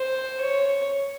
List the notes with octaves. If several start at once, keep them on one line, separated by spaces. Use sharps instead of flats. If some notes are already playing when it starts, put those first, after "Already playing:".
Already playing: C5
C#5